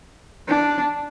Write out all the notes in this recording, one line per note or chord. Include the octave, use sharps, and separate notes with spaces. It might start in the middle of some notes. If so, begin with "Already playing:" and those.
D4